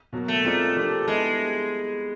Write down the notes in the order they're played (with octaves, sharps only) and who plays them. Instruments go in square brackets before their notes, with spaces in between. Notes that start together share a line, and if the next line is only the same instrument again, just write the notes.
[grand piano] B2 F#3 A#3
[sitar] A3
[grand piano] G#3 C4 F4 A#4 D5
C3 F3 A#3 D4 G4
[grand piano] G3 B3 E4 [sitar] G#3